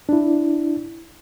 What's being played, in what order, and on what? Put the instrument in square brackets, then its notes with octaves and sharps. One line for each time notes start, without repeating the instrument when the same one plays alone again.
[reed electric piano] D4 E4